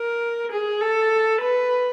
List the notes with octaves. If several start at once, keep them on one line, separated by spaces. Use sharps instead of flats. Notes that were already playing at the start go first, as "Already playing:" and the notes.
Already playing: A#4
G#4
A4
B4